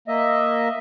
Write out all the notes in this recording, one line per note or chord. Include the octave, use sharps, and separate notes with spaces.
A#3 D#5 E5